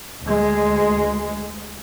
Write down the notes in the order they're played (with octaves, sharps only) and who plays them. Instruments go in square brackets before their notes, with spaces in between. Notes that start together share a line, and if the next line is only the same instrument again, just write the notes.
[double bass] D2 G#3